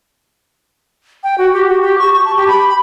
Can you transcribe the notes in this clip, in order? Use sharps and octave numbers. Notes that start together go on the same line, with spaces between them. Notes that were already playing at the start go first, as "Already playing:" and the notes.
G5
F#4
G4
F#4
G4
C#6
C#6
A5
G4
B5
B5